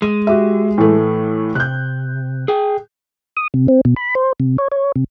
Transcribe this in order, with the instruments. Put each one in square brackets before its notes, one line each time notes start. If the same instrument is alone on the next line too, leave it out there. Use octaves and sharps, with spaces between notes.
[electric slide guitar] G#3 [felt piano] D#7
[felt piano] F#4 G4 E5
A2 E3 A3
[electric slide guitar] C3 [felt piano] F#6 G6
[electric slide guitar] G#4 G5
[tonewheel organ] D#6
C3
C4
B2
B5
C5
C3
C#5
C#5
C3